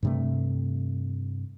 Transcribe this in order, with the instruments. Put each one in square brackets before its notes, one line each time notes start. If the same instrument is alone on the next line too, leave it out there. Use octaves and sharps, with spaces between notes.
[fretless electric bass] G2 C3 A3